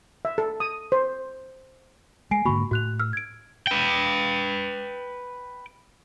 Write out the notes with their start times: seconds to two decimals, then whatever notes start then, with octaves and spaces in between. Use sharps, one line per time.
0.25 E5
0.38 A4
0.60 D#6
0.92 C5
2.31 G#3 G#5 C7 D7
2.45 G#2 D3 A#3 F#4 B5 C#6
2.71 A2 F#4 F#6 F7
3.00 E6 F6
3.13 G#6 D7
3.67 B4 G5